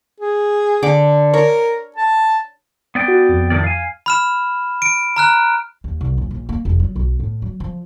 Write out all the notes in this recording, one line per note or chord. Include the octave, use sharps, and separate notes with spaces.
G#4
D3 D6
A#4 C#5
A5
B3 D5 G5
F#4
F2
A2 D#3 D5
F5 G#5
B5 F6 E7
D7
A#5 F6 F#6
D#2
C2
D#1
A#1
A#3
F1
F#3
B1
A2
F#3
F3